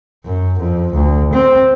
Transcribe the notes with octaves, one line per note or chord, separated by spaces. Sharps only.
F#2
F2
D2
C4